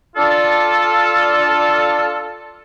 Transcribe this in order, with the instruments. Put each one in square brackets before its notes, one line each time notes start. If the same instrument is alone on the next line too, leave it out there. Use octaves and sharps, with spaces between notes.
[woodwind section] D4 F4 A4